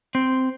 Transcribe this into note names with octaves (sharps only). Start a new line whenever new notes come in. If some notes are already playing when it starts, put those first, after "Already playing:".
C4